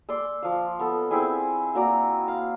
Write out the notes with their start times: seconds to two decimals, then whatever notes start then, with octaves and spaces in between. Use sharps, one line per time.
0.09 D5 C6 E6
0.43 F3 F5
0.79 B3 A4
1.11 C4 E4 G#4
1.74 A#3 F#4 D5 A#5
2.28 F5